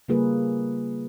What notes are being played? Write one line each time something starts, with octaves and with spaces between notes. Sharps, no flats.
C#3 G3 A#3 F4 G#4 B4